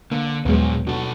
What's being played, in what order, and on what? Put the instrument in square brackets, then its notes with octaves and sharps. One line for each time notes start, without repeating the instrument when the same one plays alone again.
[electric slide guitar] D3 [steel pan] A#3
[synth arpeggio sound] D#2 G#3 [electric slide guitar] A#2 F3 [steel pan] F#3 B3
[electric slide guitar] B2 A4 [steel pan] D4 F#4